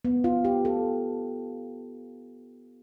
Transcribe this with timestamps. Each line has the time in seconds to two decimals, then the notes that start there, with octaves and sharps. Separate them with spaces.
0.05 B3
0.24 F4
0.45 G4
0.65 A4